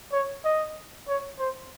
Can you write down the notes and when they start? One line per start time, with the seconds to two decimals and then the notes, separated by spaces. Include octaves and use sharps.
0.13 C#5
0.44 D#5
1.08 C#5
1.39 C5